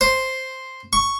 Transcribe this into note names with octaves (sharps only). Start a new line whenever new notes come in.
C5
C#6